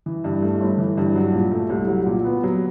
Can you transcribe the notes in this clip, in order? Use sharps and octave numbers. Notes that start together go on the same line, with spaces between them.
E3
G2
A3
G1
E3
G2
F#3
A#2
A3
C2
F#3
A#2
B3
F#3